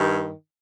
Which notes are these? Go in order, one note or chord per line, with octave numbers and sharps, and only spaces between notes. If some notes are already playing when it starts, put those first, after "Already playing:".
Already playing: G2 D#3